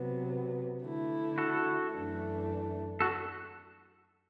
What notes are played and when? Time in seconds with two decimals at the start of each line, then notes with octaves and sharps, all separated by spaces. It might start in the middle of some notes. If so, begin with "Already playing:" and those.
Already playing: C3 F#3 B3
0.84 D3 A3 E4
1.38 F#4 A4
1.93 F#2 E3 A3 D4
3.00 F#4 A4